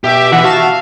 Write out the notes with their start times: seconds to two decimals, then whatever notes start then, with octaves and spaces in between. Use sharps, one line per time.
0.04 B2 G4 E5
0.32 E3 F#5
0.44 F#4 F5 A5 E7